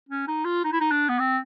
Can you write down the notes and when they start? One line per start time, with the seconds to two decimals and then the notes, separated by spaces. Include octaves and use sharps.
0.09 C#4
0.28 D#4
0.45 F4
0.64 D#4
0.72 E4
0.80 D#4
0.91 D4
1.09 B3
1.19 C4